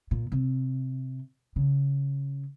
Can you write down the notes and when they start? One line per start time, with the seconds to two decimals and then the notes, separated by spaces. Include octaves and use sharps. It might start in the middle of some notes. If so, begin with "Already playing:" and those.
0.11 A#2
0.32 C3
1.56 C#3